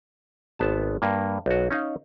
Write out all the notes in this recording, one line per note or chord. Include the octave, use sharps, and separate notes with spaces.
G#1 B3 A5
G2 A#3
B1 F#4
C#4 D#4 D#5 F5